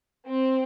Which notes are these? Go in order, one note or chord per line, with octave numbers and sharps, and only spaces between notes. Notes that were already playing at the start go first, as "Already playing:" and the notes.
C4